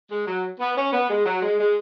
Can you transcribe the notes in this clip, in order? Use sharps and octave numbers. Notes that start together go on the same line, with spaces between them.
G#3
F#3
B3
C#4
B3
G#3
F#3
G#3
G#3